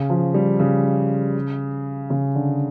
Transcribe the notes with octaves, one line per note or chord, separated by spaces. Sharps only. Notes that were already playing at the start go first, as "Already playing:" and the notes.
Already playing: C#3
F3
G3
C#3
C#3
D3